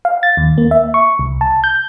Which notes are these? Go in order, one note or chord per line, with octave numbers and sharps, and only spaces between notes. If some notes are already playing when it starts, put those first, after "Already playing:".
F5
A6
D#2
A#3
E5
C#6
C2
A5
G6